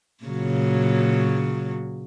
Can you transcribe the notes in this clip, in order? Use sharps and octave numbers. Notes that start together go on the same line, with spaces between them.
A#2 C#3 F#3